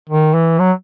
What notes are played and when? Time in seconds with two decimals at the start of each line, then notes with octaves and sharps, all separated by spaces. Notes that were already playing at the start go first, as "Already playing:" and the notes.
0.10 D#3
0.34 E3
0.59 F#3